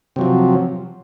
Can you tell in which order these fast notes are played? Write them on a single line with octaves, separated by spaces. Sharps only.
C3 F#3 F3